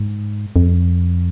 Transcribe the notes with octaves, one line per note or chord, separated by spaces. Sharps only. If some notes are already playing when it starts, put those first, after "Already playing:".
Already playing: G#2
F2